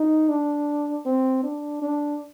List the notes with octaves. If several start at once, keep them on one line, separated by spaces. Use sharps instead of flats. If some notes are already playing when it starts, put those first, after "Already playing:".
Already playing: D#4
D4
C4
D4
D4